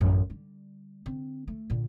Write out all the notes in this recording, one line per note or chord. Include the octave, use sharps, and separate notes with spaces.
A1 F#2
D3 G3
D3 C4
A3
A#2 D3